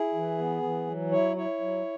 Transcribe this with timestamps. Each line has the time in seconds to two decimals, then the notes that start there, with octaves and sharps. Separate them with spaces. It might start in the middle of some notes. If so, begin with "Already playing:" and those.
Already playing: E4 G#4
0.14 E3
0.38 B3
0.63 E3
0.87 F#3
1.12 E4 C#5
1.36 E4 C#5
1.60 F#3